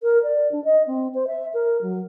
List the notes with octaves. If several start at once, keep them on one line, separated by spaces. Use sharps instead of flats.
A#4
D5
D4
D#5
C4
C5
E5
A#4
F#3